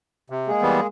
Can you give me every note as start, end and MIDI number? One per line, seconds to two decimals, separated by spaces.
0.30 0.51 48
0.47 0.87 56
0.47 0.87 58
0.47 0.87 68
0.62 0.80 52
0.62 0.80 55
0.62 0.80 59